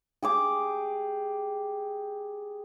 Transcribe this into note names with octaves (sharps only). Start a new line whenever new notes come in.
G4 G#4 D6